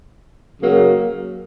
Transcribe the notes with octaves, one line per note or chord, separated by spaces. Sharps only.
F#2 C#3 F#3 A#3